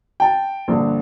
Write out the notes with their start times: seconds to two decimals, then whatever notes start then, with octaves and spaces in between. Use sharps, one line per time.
0.20 G5 A5
0.68 A#1 G2 D3